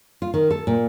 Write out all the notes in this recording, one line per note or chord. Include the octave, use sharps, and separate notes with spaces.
F4
D#3
A4
A#2